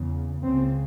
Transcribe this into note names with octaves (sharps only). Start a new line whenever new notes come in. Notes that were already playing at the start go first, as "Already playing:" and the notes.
Already playing: E2 C#3
C#2 C#3 C4